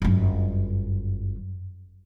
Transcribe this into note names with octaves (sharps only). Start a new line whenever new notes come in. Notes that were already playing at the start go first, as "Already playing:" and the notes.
G1 F#2